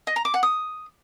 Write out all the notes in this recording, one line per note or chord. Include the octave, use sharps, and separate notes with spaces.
D#5
A#5
D6
F#5
D#6